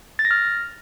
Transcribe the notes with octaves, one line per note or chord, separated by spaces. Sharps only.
A6
A#6
F6